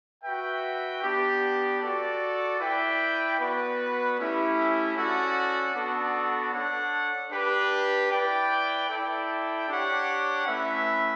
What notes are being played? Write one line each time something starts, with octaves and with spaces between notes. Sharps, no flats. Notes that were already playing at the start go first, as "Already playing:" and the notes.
F#4 B4 E5 G5
B3 D4 G4
F#4 A4 D5
E4 B4 D5 G5
B3 F#4 B4 D5
A3 C#4 E4 G4
C#4 F#4 A4 D5 F#5
B3 D4 F#4 A4
D4 A4 C#5 F#5
D4 G4 B4
E4 B4 D5 G5
E4 A4 D5 G5
D4 G4 C#5 F#5
A3 C#4 E4 B4 E5